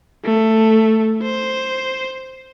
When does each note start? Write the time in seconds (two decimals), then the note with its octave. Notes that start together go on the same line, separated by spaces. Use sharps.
0.25 A3
1.22 C5